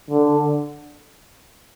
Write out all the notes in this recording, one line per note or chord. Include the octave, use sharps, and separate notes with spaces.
D3